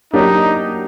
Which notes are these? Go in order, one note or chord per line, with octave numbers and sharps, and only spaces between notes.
F#3 A#3 D4 D#4 G4